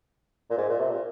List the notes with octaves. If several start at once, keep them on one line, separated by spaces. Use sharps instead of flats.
A#2
G#2
A#2
C3
A#2